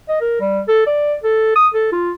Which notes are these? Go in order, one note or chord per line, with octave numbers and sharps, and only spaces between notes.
D#5
A#4
G3
A4
D5
A4
D#6
A4
F4